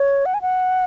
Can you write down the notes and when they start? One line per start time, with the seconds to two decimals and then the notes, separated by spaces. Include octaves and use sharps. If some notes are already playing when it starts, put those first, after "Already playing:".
Already playing: C#5
0.26 F#5
0.34 G#5
0.42 F#5